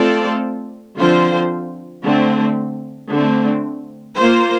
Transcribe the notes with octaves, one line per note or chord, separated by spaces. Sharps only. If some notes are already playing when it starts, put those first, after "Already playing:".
Already playing: A3 C4 F4 A4 D5
D3 F3 C4 F4 C5
D3 A3 C4
D3 A3 C4
A#3 F4 C5